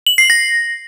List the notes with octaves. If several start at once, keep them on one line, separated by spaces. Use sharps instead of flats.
F#7
C7
A#6